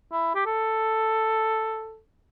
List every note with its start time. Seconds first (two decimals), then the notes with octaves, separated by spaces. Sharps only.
0.12 E4
0.35 G4
0.46 A4